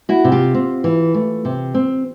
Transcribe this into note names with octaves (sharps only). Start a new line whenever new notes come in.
E4 F#4
C3
F4 G4
C4
E3
A3
C3
C4